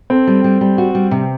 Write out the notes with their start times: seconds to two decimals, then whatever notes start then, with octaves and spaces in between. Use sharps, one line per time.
0.10 C4 A4
0.27 G3
0.44 G3
0.61 G3
0.78 F#4
0.95 G3
1.11 C3